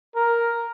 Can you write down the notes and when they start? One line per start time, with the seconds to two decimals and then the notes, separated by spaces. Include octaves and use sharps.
0.16 A#4